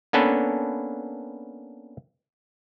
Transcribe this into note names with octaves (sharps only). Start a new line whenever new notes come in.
A#3 B3 C#4 D4 A4 B4